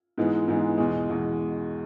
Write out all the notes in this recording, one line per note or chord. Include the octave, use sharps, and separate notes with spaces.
G#2 E3 G#3 B3
G#2 E3 G#3 B3
E2 B2 G#3
E2 B2 G#3